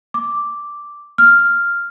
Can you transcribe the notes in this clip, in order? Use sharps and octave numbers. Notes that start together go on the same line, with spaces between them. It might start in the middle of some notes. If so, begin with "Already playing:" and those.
D6
F6